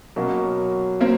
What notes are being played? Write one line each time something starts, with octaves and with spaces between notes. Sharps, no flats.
B2 F#3 A#3 C#4
A#3 C4